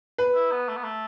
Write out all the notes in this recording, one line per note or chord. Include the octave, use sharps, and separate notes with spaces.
B4
E4
B3
A3
B3
A3